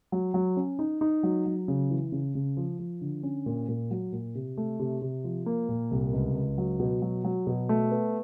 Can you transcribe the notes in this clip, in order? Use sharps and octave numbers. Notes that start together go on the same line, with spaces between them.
F#3
F#3
C#4
D#4
D#4
F#3
F#3
C#3
E3
C#3
C#3
F3
F3
D3
C#4
A#2
A#2
F#3
A#2
C3
A3
C3
C3
F3
A#3
A#2
C2
C#2
C#2
F#3
B2
F#3
F#3
B2
A3
B3